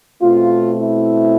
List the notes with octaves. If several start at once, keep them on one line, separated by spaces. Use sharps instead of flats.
B2 A3 C4 F4
E4